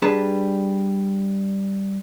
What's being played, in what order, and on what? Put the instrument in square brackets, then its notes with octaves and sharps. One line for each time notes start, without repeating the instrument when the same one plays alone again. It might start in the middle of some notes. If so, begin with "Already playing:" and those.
[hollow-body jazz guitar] G3 D4 G#4 B4 A5 A#5